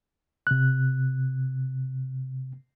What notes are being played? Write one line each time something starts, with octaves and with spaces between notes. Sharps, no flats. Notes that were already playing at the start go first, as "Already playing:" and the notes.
C3 F#6